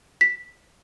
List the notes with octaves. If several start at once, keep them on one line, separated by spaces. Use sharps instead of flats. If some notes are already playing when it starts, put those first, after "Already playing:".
B6